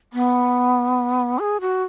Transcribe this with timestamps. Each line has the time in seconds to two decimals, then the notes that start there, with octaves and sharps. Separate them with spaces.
0.13 B3
1.39 G#4
1.61 F#4